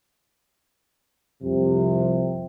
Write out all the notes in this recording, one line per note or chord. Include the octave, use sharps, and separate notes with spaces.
C2 F2 C3